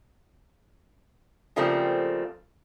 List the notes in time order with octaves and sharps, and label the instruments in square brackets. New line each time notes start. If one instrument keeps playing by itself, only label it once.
[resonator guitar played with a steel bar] C#3 F3 G3 A3 A#3 C4